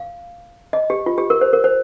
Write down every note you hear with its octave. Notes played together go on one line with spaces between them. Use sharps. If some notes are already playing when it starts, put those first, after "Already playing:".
Already playing: F5
D#5
G4
F4
G4
A#4
C5
A#4
C5